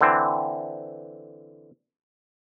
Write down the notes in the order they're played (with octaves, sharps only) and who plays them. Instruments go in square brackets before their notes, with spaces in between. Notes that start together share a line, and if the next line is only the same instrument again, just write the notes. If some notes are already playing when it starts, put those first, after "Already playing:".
[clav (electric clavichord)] D3 E3 C4